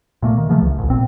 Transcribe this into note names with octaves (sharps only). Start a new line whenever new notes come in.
A#2 A3 A#3
D#3
C#3 E3 F3 A3
C#2
D1 A1
A#2 C4